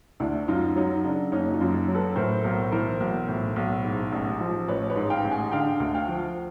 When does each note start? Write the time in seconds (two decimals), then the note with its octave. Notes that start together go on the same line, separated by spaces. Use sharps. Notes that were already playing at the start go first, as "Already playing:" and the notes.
0.20 D2 D4 E4
0.48 F#2 D#4 F4
0.76 F#3 C#4 D#4
1.04 C#3 D4
1.32 F#1 C#4 D#4
1.53 D#4 F4
1.61 F#2
1.88 F#3
1.95 A4 B4
2.16 A2 A#4 C5
2.44 B1 A#4 C5
2.72 E3 A#4 C5
3.00 B1
3.28 A2
3.56 B1
3.84 G#2
4.12 A1
4.40 F3
4.68 A1 B4 C#5
4.90 B4 C#5
4.96 G#2
5.10 F5 G5
5.25 A1
5.31 F#5 G#5
5.52 D3 F5 G5
5.80 D2
5.94 F5 G5
6.08 F3